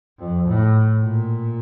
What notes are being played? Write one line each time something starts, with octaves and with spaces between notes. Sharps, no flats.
F2
A2
A#2